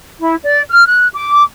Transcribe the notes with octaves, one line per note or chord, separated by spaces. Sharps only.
E4
D5
F6
F#6
D6